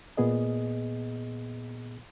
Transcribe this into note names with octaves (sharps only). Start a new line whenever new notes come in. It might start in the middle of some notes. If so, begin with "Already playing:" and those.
A#2 B3 G#4 D#5